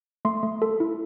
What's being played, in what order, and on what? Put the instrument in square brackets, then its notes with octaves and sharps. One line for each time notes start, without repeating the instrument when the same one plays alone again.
[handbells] A3 C6
A3
A4
E4